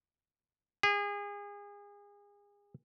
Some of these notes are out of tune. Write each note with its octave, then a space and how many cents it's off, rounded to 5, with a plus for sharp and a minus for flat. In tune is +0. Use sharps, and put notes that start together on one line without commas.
G#4 -30